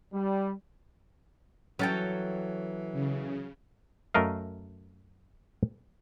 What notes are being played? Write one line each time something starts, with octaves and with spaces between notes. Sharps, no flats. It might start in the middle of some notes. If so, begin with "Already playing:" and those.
G3
E3 F#3 C#4 A4 G5
C#3
F#2 A3 A#4 D#5 F5